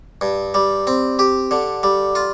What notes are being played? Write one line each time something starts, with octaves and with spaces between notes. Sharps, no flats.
G2
G3
C4
G4
D3
G3
F4